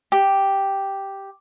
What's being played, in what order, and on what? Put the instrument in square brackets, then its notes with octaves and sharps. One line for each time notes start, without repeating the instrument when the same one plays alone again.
[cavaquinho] G4